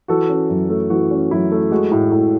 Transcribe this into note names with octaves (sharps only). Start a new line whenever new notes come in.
E3 F#4 A4
C#4
F#2
A3
E3 F#4
C#4
F#2 E4
A3
G#3 F#4
A2
A2